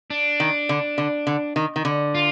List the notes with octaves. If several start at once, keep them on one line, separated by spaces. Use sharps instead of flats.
D4
D#3
D3
D3
D3
D#3
D#3
D3
F4